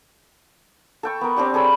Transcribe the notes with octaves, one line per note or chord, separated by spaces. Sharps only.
A4 G5 C#6
B3 A#4
C4 D4 G4 D5
G#4 A4 C#5 B5